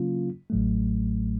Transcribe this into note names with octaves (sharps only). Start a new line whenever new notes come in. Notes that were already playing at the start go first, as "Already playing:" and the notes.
Already playing: C#3 F#3 A#3 C#4 F4
A1 A2 F#3 A3